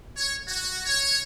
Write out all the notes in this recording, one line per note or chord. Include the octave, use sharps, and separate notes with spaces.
C#5
F#4
C#5